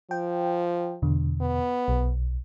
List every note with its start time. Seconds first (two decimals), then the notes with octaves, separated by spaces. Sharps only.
0.11 F3 G5
1.02 E2 B2 D3
1.41 B3
1.88 B1